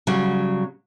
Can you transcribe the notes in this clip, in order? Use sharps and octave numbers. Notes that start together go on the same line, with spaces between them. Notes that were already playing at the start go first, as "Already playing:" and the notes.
C#3 F#3 G3